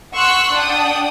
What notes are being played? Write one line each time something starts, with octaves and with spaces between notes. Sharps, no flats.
F#5 C6 C#6 E6 F#6
D4 F#5 G5 D#6